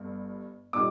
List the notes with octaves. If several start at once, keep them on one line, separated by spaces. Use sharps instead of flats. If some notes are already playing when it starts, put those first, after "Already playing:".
Already playing: G1 G2
A#2 G3 D#4 D6